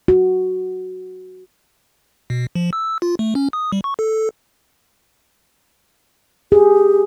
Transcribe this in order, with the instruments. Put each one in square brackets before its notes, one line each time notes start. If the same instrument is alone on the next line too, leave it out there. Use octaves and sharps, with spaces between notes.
[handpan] F#4
[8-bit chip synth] B2
F3
E6
F4
A3
C#4
D#6
G3
C#6
A4
[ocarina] G4 [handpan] G#4